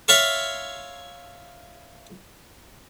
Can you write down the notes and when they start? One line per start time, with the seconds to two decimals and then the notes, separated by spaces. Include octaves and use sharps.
0.08 C#5 E5 F5 A5 C6 C#6